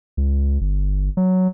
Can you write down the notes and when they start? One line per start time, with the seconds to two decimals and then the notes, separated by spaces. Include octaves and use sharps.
0.17 C#2
0.61 G1
1.17 F#3